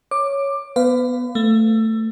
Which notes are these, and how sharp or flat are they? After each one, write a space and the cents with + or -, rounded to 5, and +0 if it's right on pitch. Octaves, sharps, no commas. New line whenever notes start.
C#5 +0 D6 +15
B3 +0 B4 +35 F5 +0
A3 +15 E6 +20